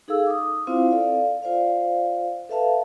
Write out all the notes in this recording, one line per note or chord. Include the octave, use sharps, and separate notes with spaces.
D#4 G#4 A4 F5 E6
D6 D#6
C4 E4 F4 C5 F5
A4 D5 F5
F4 C5 D5 F5
A4 B4 E5 F5 A5